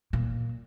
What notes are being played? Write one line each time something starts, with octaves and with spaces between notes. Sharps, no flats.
A#2